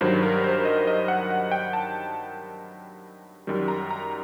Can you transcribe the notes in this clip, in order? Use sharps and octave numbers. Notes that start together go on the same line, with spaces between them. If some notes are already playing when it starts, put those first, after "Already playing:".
G2 D#3 F#3 C5
A#4
C5
D#5
D#5
F#5
F#5
G5
A5
F#2 D#3 G3
A#5
A#5